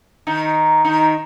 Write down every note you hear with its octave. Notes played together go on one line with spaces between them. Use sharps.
D#3 D#4
D#3 D#4